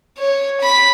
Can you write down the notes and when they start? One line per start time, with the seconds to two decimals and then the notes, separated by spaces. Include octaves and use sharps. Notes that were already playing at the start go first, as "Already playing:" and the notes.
0.19 C#5
0.61 B5 B6